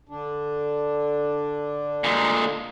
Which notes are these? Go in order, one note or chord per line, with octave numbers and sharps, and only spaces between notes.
D3 D4
A#2 G#3